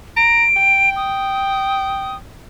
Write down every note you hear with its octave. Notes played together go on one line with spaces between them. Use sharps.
A#5 D7
G5
D#6